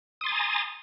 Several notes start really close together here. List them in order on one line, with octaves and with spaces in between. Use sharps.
D#6 C6 A6 G#5 A#5